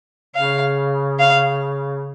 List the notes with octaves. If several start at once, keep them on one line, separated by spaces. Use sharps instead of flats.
C#3 F5
F5